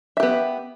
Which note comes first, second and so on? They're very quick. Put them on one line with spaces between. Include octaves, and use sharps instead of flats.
E5 G4 B3